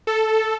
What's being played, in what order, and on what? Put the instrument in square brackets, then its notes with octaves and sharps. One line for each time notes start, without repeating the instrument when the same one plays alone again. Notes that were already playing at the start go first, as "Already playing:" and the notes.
[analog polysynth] A4